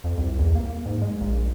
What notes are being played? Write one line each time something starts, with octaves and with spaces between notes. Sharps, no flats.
F2
C2
E2
A#3
G#2
G#3
A#1